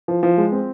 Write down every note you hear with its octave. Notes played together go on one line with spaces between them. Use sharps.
F3
F3
G#3
C4